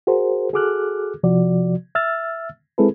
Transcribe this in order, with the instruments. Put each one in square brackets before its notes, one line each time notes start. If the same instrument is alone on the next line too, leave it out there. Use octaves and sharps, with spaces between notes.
[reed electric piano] F#4 G#4 A#4 C5
F#4 G#4 A4 D6 F6 F#6
C3 F3 F#4 D5
E5 E6 F6 A6
G#3 C4 E4 G#4 A4 B4